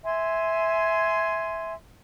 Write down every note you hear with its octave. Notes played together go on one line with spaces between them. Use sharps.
E5 G#5 C6